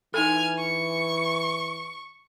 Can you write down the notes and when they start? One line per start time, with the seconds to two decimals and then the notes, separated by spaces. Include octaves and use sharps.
0.14 E3 D#4 A4 G#5 F6
0.59 C#6